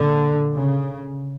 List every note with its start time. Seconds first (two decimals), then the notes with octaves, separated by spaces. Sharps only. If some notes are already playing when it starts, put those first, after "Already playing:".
Already playing: A#2 D3
0.54 C#3